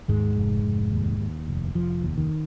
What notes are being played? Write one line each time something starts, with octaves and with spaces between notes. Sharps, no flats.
D#2 G#2 G#3
F1
F1
D#2
D#2
F1
F1 F3
D#2
D#3